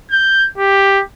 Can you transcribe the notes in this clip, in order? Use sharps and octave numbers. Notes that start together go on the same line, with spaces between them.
G6
G4